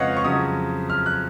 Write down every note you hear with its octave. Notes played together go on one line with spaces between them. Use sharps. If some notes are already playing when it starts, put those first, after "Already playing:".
Already playing: F2 C#3 G#3 B4 C#5 D#5 F5 F#5
C#6
F2 C#3 F#3 D#6
F6
F#6